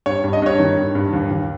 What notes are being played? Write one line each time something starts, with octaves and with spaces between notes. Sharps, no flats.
G2 C#5
G2
D#5
G2 C#5
D#3
G2
G2
D#2
D#2